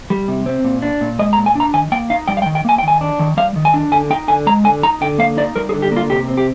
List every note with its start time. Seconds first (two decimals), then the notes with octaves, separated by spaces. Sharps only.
0.10 G3
0.28 C3
0.46 C4
0.65 A#2
0.82 D4
1.01 A#2
1.19 G#3 D#5
1.33 A#5
1.37 A#2
1.46 G#5
1.55 D4 A#5
1.74 D#3 G#5
1.92 A#3 G5
2.10 D#4 F5
2.28 G3 G5
2.37 F5
2.42 G5
2.46 D#3
2.55 G5
2.65 A#3 G#5
2.78 G5
2.83 D#3
2.88 G#5
3.01 D4
3.19 D#3
3.37 G3 F5
3.56 D#3
3.65 G#5
3.74 D4
3.92 D3 G#5
4.10 D#4 G5
4.28 D3 G#5
4.46 G#3 A#5
4.64 D3 G#5
4.83 D#4 A#5
5.01 D3 G5
5.18 A#3 F5
5.37 D#4 D5
5.56 G3 A#4
5.69 G#4
5.74 D3
5.82 G4
5.92 A#3 F4
6.10 C3 G4
6.28 C4
6.37 G4